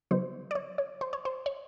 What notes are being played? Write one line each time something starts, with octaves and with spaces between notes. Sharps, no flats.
C#3 F#3 B3 D#4 C5
D5
C#5
C#5
C5
C#5
C5
C#5